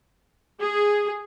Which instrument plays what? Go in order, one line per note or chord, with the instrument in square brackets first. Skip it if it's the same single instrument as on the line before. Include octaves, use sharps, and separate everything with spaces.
[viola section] G#4